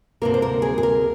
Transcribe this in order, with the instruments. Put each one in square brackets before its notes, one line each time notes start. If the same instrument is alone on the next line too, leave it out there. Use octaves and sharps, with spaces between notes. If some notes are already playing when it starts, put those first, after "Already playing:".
[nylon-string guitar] D2 C3 D#3 A#3 A#4
C5
A#4
G#4
G#4
A#4